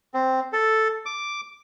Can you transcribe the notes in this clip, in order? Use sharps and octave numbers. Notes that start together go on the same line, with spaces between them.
C4
A4
D6